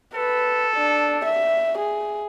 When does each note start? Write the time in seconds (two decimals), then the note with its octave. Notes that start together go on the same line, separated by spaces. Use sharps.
0.14 A4 B4
0.76 D4
1.25 E5
1.78 G#4